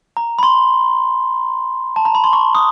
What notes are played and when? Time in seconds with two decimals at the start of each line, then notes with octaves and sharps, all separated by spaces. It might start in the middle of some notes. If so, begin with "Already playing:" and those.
0.17 A#5
0.39 B5
0.43 C6
1.96 A5
2.05 A#5
2.15 B5
2.24 C6
2.33 C#6
2.55 D#6